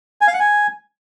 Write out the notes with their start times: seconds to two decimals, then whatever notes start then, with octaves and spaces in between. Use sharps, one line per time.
0.21 G#5
0.27 F5
0.34 F#5
0.40 G#5